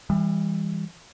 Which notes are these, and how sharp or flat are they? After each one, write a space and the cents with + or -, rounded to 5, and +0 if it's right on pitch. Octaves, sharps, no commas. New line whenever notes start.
E3 +0 G3 +35